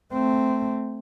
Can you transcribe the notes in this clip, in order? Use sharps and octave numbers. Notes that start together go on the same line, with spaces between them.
A3 C4